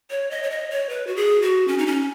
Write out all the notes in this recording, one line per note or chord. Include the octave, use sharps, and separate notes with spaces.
C#5
D#5
C#5
D#5
C#5
B4
F#4
G#4
F#4
C#4
D#4
C#4